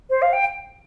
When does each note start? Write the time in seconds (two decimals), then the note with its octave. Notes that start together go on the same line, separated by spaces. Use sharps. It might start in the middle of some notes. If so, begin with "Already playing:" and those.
0.10 C5
0.22 F5
0.33 G5